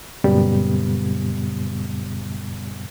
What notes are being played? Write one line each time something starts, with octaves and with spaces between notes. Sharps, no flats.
F#2 A#2 C#3 G3 B3